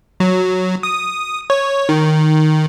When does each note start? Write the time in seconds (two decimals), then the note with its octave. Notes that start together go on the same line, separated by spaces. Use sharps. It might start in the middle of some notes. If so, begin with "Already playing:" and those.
0.20 F#3
0.83 D#6
1.50 C#5
1.89 D#3